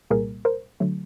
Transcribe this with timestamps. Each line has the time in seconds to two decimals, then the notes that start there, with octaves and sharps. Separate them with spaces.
0.10 C2 A#2 G3 A#3 G#4 A#4
0.45 A#4 C5
0.80 D3 F#3 A3